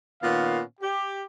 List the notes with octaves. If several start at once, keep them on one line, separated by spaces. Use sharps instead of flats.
A#2 D#3 B3 C#4 F5
G4